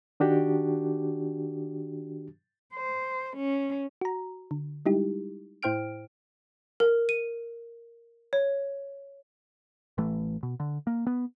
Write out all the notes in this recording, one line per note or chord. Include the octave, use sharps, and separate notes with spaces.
D#3 D4 F#4 G4
C5
C#4
F#4 A#5
D3
G3 G#3 D#4 E4 G4
A2 E4 C5 G5 F6 D7
A#4
D#7
C#5
A1 E3 A3
B2
D3
A#3
B3